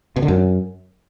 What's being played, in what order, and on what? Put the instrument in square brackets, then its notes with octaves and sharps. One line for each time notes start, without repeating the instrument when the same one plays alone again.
[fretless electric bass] B2
D3
F#2